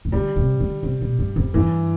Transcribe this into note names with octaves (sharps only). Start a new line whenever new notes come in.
C3
D3 G3
C3
D3
C3
B2
G2
F2
G2 E3